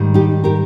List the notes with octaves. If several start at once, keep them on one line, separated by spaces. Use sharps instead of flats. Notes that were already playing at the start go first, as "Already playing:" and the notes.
Already playing: G#2 D#3 G3
D#4 G4
G4 A#4